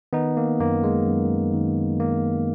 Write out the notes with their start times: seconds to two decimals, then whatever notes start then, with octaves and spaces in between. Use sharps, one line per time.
0.13 D#3 B3 D#4
0.37 A#3
0.60 F#2 A#3
0.84 G#3
1.06 F#2
1.53 D#3
2.00 D#3 A#3